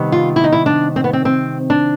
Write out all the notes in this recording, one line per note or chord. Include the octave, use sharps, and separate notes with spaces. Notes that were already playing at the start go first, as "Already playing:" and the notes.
Already playing: C3 D#3 G3 B3
F4
E4
D#4
E4
D4
C4
B3
C4
C4
D4